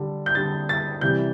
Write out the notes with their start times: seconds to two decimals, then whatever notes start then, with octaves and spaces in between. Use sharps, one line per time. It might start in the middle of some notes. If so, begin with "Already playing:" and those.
Already playing: D3 G3
0.26 G6
0.35 D3 G3 A6
0.69 A6
1.01 C3 E3 G3 G6